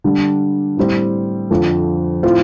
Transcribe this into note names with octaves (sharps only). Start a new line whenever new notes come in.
D3 G3 D4
A2 G3 C4
F2 D3 F3
A2 F3 C4 F4